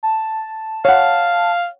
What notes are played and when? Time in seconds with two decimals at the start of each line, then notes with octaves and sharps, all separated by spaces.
0.03 A5
0.85 C#5 F5 F#5